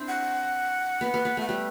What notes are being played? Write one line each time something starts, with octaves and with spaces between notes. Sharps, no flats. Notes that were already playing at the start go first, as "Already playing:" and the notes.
Already playing: C4 D4 E4
F#5
B3
B3
B3
A3 F#5
G3 G5